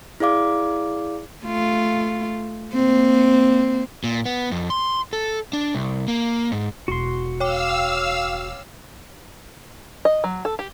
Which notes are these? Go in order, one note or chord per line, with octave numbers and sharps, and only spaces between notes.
E4 G#4 D5 F5 D6
A3 F4
A#3 C4
A#2
B3
F2
C6
A4
D4
C2
A#3
G#2
E1 E4 F#4 C6
C#5 F5 G5 D6 E6
D#5
F#3
A4
G4